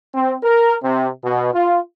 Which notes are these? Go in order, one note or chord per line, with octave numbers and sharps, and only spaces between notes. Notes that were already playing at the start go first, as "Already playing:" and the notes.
C4
A#4
C3
B2
F4